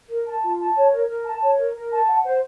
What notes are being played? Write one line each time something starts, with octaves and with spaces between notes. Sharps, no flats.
A#4
A5
F4
A5
C#5
A#4
A#4
A5
C#5
A#4
A#4
A5
F#5
C5